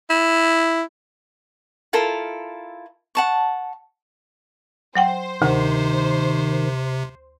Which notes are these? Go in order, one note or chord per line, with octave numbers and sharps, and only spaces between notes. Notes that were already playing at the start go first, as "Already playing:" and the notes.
E4
E4 F4 A4 A#4
F#5 A5 C#6
F#3 C5 F#5 G5
D2 C3 D#3